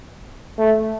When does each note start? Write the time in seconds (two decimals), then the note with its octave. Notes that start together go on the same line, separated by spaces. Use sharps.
0.59 A3